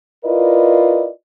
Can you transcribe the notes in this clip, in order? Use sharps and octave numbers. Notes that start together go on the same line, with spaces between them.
E4 F4 A#4 B4 D5 D#5